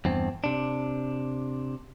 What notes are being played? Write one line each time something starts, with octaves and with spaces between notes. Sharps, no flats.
E2 G2 C4
C3 D4